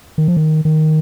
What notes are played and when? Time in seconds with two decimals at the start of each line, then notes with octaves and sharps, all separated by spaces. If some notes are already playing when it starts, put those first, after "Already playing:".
0.18 D#3
0.28 F3
0.37 D#3
0.65 D#3